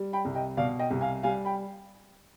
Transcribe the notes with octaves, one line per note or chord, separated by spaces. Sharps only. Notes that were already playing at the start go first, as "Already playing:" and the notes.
Already playing: G3
G5 B5
C2
D#5 G5
B2 D5 F5
D#5 G5
C2
F5 G#5
G3 F5 G#5
G5 B5